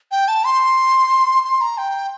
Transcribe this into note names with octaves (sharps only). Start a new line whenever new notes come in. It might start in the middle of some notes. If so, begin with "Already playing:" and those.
G5
A5
C6
C6
A#5
G5